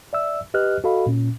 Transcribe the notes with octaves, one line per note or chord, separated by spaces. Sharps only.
D5 E5 E6
G4 B4 D#5 F6 F#6
F#4 A4 D#5 F5 B5
A#2 C#4